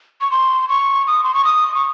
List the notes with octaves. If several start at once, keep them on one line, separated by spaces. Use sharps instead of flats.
C#6
C6
C#6
D#6
C6
C#6
D#6
C#6